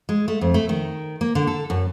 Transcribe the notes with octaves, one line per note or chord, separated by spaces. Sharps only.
G#3
A3
F2
A3
D#3
A#3
D3
A4
F#2